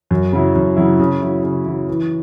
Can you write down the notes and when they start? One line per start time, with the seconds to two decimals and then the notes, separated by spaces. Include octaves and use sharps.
0.11 F#2
0.32 C#3 F#3 E4
0.56 F#2
0.77 C#3 F#3 E4
0.99 C#3
1.22 F#3 E4
1.43 C#3
1.66 F#3 E4
1.88 E3